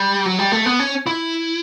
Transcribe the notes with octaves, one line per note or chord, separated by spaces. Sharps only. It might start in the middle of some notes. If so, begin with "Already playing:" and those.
Already playing: G3
F#3
G3
A3
B3
C#4
E4